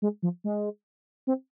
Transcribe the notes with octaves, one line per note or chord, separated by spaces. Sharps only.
G#3
F3
G#3
C4